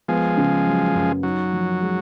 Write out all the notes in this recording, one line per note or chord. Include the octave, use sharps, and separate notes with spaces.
F3 G#3 B3
C#3
F#3
F#2
F#3 D#4
F3
G#3